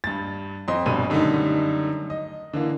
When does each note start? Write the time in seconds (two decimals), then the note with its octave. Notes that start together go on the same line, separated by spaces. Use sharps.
0.04 G2 A6
0.68 F2 D#5 C6
0.86 F1 G2 B2 D#7
1.10 F#2 D3 D#3 G3 A3 D#4
2.10 D#5
2.53 D3 E3 A#3